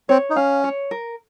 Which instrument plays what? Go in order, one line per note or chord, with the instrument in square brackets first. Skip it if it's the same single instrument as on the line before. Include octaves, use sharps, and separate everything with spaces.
[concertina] C4 [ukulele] C#5
[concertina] D#4
[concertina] C#4 [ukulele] F5
[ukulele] C#5
A#4